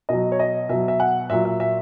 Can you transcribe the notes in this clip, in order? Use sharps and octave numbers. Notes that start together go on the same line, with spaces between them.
B2 F#3 D#5
C#5
D#5
B2 F#3 E5
E5
F#5
A#2 F#3 E5
E5
E5